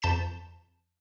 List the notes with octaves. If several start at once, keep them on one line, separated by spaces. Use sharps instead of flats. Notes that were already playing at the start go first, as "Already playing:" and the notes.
F2 A5 G6 B6 E7